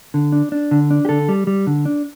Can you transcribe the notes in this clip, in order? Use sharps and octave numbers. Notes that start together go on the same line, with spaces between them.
D3
D4
D4
D3
D4
G4
D3 A4
G3
G3
D3
D4